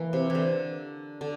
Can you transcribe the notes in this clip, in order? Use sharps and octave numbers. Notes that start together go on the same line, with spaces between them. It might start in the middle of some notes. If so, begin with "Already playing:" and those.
Already playing: E3 A#3
C3
D3 E3
D3